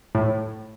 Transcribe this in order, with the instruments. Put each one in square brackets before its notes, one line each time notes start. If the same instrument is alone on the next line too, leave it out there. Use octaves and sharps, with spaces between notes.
[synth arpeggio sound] A2